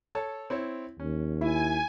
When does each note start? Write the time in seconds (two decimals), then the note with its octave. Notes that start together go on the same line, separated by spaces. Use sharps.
0.15 A4 C#5 A5
0.50 C4 E4 C#5
1.00 D#2 C#4
1.41 E4 G#5